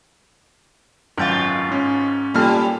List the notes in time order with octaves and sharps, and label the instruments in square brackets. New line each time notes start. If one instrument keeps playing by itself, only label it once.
[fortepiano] G#1 [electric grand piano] F#2 G6 A6 [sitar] B2 F4
[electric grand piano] G#2 C#4
[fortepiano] A#2 A4 F6 [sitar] G3